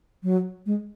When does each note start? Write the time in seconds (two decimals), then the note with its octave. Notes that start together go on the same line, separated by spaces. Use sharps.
0.23 F#3
0.66 G#3